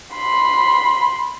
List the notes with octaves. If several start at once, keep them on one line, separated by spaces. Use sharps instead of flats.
B5 C6